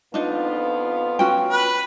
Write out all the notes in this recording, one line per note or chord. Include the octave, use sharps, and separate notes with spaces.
F2 B3 D4 D#4 F4
C#4 F#4 G5
B4